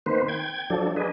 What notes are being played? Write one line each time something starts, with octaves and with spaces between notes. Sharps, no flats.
D#3 A#3 C4 B4 C5
G5 G#6
F3 F#3 D4 A4
D4 G#4 B4 D#5